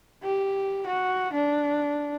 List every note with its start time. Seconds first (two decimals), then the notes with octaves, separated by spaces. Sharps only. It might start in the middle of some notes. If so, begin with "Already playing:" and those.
0.23 G4
0.86 F#4
1.33 D4